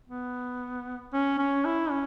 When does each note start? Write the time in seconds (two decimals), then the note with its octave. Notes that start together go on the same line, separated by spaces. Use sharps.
0.08 B3
1.14 C#4
1.39 C#4
1.65 E4
1.91 C#4